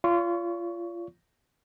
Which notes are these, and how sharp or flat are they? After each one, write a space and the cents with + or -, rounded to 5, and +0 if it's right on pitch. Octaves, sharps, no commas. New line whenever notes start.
F4 -20 D5 -45 C#6 +10